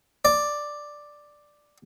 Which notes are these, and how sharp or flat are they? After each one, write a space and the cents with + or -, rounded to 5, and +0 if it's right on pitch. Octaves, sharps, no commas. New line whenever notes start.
D5 +5